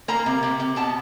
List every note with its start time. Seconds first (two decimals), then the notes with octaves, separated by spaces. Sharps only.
0.08 A#3 A#5
0.26 C3
0.43 C3
0.60 C3
0.76 B2 A5